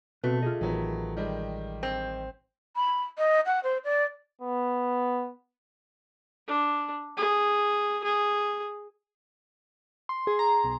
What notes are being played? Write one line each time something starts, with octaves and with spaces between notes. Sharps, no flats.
B2 A3 C4 F#4 B4
F4 G#4 D#5
A1 D#3 F#3 B3
D#3 G3 G#3
C4
B5
D#5
F#5
C5
D5
B3
D4
G#4
G#4
C6
G#4
A#5
B1